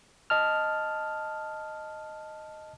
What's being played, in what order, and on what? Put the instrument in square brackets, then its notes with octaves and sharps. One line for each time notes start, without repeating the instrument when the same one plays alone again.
[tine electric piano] D#5 A5 F6